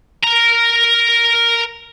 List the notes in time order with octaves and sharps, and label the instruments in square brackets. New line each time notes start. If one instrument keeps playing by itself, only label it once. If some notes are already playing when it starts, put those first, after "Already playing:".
[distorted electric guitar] A#4 A#5